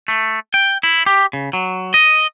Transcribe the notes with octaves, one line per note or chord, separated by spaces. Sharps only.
A3
G5
E4
G4
C#3
F#3
D#5